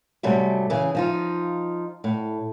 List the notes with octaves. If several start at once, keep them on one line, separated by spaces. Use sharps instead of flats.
G#2 C3 F#3 G3 A3
C#3 E3 G#4
F3 D#4 F4
A2